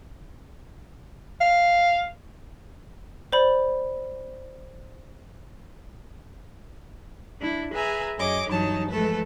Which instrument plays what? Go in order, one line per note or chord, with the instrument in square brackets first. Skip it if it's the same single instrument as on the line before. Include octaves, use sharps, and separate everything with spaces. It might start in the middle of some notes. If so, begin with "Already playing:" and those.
[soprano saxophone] F5
[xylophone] C5 D5 B5
[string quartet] D4 E4
G#4 B4 E5 G#5 A#5
F#2 G#4 C#5 D#5 D6
G2 E3 F#3 D#4 C#5 A5
E3 F3 G#3 A3 A4 B4